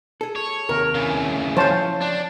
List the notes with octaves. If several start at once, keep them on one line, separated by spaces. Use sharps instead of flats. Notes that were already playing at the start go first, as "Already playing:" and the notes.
G#4 A4
C#5
D#2 C3 A#4
C#3 E3
F3 C5 C#5 F5 A5
D4